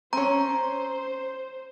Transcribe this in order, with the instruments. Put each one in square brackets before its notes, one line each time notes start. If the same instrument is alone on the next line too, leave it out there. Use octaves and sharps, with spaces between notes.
[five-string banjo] C4 C#4 [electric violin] C5 [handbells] A#5